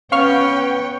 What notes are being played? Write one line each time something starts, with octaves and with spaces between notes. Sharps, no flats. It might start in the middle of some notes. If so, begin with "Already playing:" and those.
B3 C#4 B4 C#5 F5 G5 C#6 F6